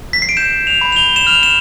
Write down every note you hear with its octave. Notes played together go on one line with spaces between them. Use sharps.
B6
C7
D7
G6 E7
F7
B5
F7
G7
E7
F6 F7
E7